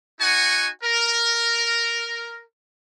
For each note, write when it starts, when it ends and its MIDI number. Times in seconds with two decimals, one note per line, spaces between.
0.21 0.69 63
0.21 0.69 66
0.21 0.69 78
0.21 0.69 80
0.21 0.69 85
0.83 2.43 70